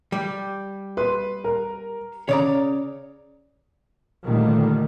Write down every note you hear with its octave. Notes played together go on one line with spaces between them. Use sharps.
G3
B4 C6
A#4
C#3 C#5 D5 A#5
A#2 D3 D#3 G3 A3